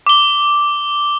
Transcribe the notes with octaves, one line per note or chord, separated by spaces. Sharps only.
D6 G7